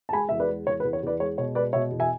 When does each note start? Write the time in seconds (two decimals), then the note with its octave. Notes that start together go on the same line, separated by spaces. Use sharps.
0.09 A5
0.13 G#3 G#5 B5
0.29 E2 E5
0.40 B4 D5
0.48 G#3
0.67 E2 C#5
0.80 B4
0.84 E2
0.93 C#5
1.03 E2 B4 D5
1.20 G#3 C#5
1.38 B2 C#5
1.55 G#3 B4 D5
1.73 B2 C#5 E5
1.91 E2
2.00 E5 G#5